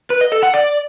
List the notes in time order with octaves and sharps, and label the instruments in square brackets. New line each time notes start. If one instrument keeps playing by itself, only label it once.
[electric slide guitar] B4
D#5
A4
F#5
D5